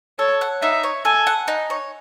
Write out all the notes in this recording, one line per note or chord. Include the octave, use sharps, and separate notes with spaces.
A4 C#5
F#5
D#4 E5
C#5
A4 G#5
F#5
D#4
C#5